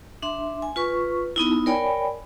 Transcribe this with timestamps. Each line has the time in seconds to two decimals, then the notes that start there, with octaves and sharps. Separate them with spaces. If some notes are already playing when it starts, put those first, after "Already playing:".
0.22 D4 E5 C6
0.62 G#5
0.76 F4 B4 C#6
1.36 B3 D#4 E4
1.66 A#4 C#5 D5 G5 G#5 B5